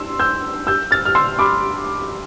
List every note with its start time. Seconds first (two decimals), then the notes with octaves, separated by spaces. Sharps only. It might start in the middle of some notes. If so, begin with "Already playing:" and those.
Already playing: C6 E6
0.19 E6 G6
0.67 E6 G6
0.91 F6 A6
1.05 F6
1.15 C6 E6
1.39 B5 D6